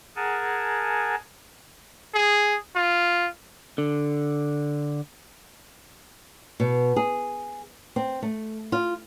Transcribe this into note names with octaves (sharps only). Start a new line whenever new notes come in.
G#4 A#4 F#5 G#5 A5
G#4
F4
D3
B2
G#4
C4
A3
F4